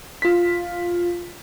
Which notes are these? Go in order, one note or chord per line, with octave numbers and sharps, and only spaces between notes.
F4 B6